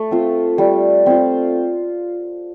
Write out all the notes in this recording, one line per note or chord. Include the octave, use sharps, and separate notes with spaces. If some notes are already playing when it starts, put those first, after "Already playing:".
Already playing: A3
C4 F4
G3
C4 F4